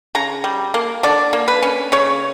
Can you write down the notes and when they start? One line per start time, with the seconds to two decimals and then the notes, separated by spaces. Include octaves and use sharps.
0.15 C#3 A#5
0.44 G3
0.74 A#3
1.03 D3 D5
1.33 A#3
1.48 B4
1.62 C#4
1.92 C#3 C#5